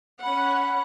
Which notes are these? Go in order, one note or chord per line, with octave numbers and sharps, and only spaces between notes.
C#4 F#5 B5